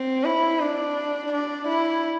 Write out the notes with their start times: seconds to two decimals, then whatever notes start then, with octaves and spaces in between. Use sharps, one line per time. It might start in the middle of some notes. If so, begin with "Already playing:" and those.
Already playing: C4
0.24 E4
0.60 D4
1.32 D4
1.68 E4